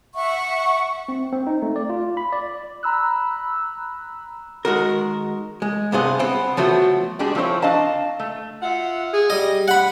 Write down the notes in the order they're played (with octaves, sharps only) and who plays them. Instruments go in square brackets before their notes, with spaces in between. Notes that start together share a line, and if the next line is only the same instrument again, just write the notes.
[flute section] E5 F#5 C#6
[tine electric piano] C4
C4
D#4
A3
D5
F4
B5
D5
[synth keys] A#5 B5 E6 F#6
[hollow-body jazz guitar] D#3 G#3 F#4 A#4
G#3
G2 C3 B3 D4 G#4 C5
B3 C4
F3 F#3 A3 B3 F#4
[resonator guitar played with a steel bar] G3 G#3 D4 G#4
F3 C4 E4 G#4 C5 C#5
D4 D#5 F5 A5
A3
[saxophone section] F4 E5 F#5
G#4
[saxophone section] G3 [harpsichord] D#5
[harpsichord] F#5 B5